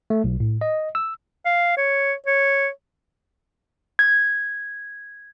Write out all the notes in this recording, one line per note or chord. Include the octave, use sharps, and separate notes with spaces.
A3
B1
A2
D#5
E6
F5
C#5
C#5
G#6